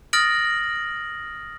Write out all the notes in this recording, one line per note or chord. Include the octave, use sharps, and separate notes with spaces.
D#6 F6 A6 A#6 D7 F#7